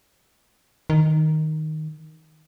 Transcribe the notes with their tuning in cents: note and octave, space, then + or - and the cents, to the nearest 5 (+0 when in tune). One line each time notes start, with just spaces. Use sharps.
D#3 +0